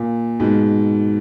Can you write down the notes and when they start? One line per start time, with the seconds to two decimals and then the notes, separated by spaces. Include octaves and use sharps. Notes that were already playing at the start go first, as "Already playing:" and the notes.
Already playing: A#2
0.40 G#2 B2